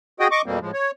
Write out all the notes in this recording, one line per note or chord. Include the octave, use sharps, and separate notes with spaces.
F#4 G#4 D#5 G5 D#6
D#5 C#6 D6
F2 B2 G3 A#3 C4
A2 F3 G#3
C#5